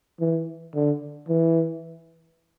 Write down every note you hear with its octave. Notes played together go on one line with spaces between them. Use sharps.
E3
D3
E3